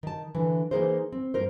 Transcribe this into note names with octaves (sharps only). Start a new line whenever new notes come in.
D#3 A5
D3 E3
E3 A#3 D#4 G#4 A#4 C5
C4
G2 A#3 A#4 C5